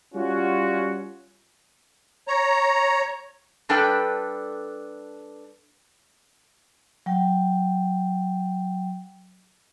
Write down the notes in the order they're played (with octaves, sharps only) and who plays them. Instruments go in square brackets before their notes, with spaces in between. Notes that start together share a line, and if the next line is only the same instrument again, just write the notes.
[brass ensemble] G3 C#4 F4 F#4
[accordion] C#5 A#5
[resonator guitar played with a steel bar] G3 D4 A4 B4 G5
[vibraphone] F#3 G5